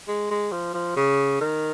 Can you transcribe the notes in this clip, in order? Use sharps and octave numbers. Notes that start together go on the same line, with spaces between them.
G#3
G#3
F3
F3
C#3
D#3